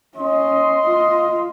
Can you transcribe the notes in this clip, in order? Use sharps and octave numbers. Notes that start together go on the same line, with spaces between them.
C#4 D#5 C6
F4